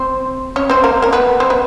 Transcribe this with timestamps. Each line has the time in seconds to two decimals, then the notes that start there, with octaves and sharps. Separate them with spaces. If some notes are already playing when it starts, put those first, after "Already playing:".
Already playing: C4 C5
0.56 C#4 C#5
0.70 C4 C5
0.84 A#3 A#4
1.02 A#3 A#4
1.13 B3 B4
1.40 C4 C5
1.50 B3 B4